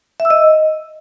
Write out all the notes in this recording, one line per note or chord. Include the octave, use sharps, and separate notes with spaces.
E5
E6
D#5